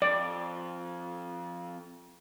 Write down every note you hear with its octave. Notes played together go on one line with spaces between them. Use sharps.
F2 D5